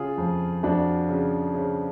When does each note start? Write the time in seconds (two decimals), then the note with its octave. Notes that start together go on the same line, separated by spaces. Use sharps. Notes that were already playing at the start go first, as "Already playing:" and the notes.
Already playing: C#3 F4 G#4
0.18 F2
0.63 F2 D4 F#4
1.09 C#3
1.54 C#3